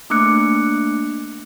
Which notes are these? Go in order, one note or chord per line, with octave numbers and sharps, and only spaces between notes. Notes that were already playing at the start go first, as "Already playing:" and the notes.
A3 A#3 D4 D6 F#6 C#7